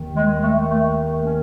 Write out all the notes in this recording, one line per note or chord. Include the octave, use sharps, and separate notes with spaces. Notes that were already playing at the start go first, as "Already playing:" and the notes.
Already playing: D#2 D#3
G#3
A3
A3
C#4